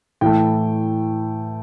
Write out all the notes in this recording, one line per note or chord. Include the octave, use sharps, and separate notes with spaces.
A2 E3 A3 G5